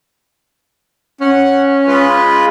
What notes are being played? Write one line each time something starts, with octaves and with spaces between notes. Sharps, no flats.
C#4 F#5
G#3 F4 B4